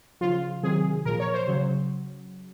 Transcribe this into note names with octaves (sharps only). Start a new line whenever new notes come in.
C#3 F3 F4
C3 D#3 F#3 G#4
A#2 F3 A#4
C#5
C5
C#3 F#3